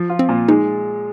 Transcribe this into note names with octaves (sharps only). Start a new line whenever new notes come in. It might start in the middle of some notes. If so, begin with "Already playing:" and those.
Already playing: F3
F4
C4
A#2
G#3 D#4